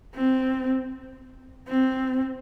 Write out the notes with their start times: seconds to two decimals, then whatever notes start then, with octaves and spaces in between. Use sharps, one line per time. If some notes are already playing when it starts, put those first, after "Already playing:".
0.15 C4
1.68 C4